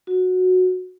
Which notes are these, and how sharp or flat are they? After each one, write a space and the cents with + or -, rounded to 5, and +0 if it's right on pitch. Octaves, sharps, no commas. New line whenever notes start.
F#4 -10